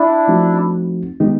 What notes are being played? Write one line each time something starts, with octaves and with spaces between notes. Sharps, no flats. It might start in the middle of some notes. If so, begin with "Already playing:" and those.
Already playing: D4 E4
F3 A3 C4 D#4 F#4
D#3 G#3 B3 D#4 G4